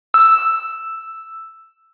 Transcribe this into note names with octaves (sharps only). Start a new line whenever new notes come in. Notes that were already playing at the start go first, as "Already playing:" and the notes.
E6